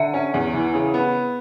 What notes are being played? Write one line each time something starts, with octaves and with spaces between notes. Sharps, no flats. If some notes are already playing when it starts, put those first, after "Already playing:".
Already playing: D3 E5 F#5
C#4
E2
E3
C#3
B3